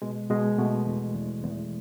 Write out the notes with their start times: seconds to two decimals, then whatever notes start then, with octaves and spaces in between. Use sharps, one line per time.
0.02 B2 G#3
0.30 B2 G#3
0.58 B2 A3
0.87 E2
1.14 E2
1.43 E2